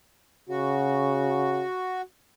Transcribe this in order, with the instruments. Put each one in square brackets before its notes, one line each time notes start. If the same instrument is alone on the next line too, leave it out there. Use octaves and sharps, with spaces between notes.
[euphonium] C#3 [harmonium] F#4